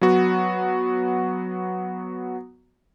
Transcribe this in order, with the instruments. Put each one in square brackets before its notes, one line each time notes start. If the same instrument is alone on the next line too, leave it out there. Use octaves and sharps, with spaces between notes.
[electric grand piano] F#3 B3 F#4